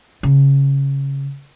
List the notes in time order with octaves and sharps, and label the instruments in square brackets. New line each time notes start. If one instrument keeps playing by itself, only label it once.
[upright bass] C#3